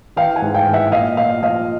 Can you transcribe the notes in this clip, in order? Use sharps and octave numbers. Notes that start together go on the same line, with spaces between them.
E3 F5 G5
F#5 G#5
G#2
F5 G5
E3
E5 F#5
A#2 D#5 F5
A#2 D#5 F5
F3 D#5 F5